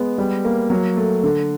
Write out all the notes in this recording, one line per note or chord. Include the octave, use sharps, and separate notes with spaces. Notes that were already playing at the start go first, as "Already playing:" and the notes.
Already playing: G#3 B3
G3
A#3
F#3
A3
D3